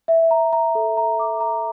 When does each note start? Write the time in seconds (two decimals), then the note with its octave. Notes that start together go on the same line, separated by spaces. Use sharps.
0.08 E5
0.31 A#5
0.53 A#5
0.75 A4
0.97 A#5
1.19 D6
1.40 A#5